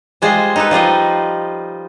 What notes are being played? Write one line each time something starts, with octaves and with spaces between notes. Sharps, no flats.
G3 G#3 F4 C5 D#5
D#4 A4 B4
F3 G3 F4 D#5